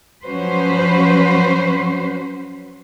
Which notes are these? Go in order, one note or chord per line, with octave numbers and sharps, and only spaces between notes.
F3 F#3 C#4 F#4 B4 C5